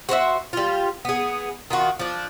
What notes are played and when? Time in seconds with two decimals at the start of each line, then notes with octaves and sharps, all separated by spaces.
0.09 F#4 C5 C#5 E5
0.53 G3 F4
1.05 B3 G#4
1.70 D#3 F4 F#4
1.99 F3 D4